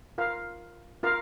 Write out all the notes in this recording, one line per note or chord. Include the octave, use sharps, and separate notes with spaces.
F4 A#4 F5
F4 A#4 F5